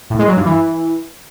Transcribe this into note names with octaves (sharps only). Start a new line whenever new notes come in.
A2
G#3
F#3
G2
E3